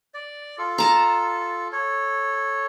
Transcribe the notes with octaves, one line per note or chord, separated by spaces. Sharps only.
D5
F4 A4
A5 A#5
A4 C#5